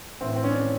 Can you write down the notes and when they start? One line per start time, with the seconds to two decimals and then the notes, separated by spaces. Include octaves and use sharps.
0.21 A2 E3 C4
0.36 C4
0.44 C#4
0.51 D4